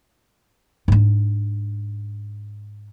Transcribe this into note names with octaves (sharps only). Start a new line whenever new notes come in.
G#2 D4